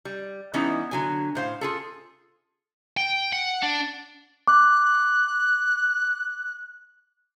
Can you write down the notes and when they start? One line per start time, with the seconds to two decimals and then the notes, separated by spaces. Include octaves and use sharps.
0.05 G3
0.54 E3 G3 B3 C#4 D#4 E4
0.91 D3 F#3 G#5
1.35 A2 C5 F5
1.61 F4 G#4 A4
2.97 G5
3.33 F#5
3.62 D4
4.48 D6 F#6